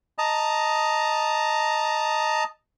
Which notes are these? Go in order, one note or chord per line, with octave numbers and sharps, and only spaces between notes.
D#5 A5 A#5